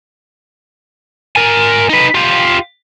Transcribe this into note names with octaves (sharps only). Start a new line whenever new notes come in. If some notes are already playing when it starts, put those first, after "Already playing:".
A#4 G#5
D#4 B4
F4 G4